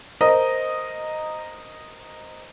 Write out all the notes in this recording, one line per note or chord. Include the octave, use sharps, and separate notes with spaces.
A#4 C5 D#5